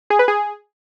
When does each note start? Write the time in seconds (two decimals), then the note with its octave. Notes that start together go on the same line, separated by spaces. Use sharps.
0.10 G#4
0.19 B4
0.28 G#4